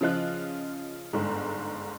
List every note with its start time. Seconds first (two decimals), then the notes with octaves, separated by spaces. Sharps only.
0.01 C#3 F3 F4 D#5 F#6
1.13 G1 G#2